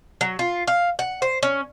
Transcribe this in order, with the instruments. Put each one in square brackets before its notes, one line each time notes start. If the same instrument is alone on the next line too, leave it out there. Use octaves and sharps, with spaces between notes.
[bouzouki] F#3
F4
F5
F#5
C5
C#4